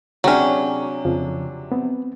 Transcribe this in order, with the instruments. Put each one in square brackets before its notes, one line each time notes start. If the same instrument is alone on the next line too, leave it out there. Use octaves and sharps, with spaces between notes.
[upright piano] C3 D4 [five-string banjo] F#3 C#4 [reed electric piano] F#4 G#4 G5
[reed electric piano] F2 C#3 F3
B3 C4